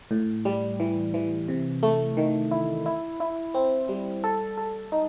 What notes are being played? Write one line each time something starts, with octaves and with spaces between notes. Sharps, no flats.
A2
G3
E3
E3
C3
A3
D#3
E4
E4
E4
C4
G3
A4
A4
D#4